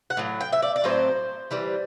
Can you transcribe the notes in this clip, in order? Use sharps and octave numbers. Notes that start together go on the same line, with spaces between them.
F#5
A2 F#3
G5
E5
D5
D5
A2 F#3 C4 C5
E3 G3 C4